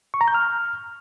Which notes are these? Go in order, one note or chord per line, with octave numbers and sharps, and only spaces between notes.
C#6
A#5
G6
F6